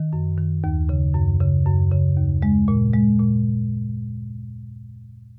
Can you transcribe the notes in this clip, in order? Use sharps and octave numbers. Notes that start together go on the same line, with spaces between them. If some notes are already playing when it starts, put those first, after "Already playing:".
Already playing: D#3
F#2
D#3
D#2
C#3
F#2
C#3
F#2
C#3
D#2
G#3
A#2
G#3
A#2